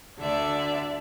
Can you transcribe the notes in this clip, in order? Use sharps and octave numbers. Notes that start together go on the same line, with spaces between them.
D2 D3 D5 E5